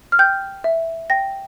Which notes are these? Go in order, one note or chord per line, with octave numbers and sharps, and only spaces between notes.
F6
G5 G6
E5
G5 A#6